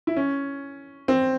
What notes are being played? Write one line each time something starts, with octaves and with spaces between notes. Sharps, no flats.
E4
C#4
C4